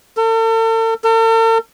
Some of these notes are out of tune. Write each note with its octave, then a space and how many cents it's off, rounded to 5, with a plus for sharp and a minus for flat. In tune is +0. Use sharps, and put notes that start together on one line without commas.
A4 +40
A4 +45